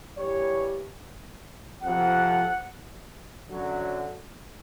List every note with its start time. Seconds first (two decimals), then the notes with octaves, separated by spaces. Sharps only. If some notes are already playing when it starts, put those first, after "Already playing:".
0.17 G2 E3 G3 C#5
1.83 F2 C3 F3 F#5
3.50 F#2 D3 F#3